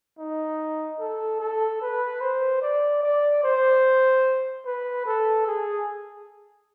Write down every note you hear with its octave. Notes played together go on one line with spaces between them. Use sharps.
D#4
A4
A4
B4
C5
D5
D5
C5
B4
A4
G#4